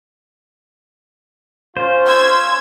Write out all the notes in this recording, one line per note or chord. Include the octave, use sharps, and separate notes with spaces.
C#4 F4 C5
C6 E6 G#6